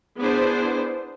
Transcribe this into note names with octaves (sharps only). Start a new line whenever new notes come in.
B3 D4 E4 G#4 C5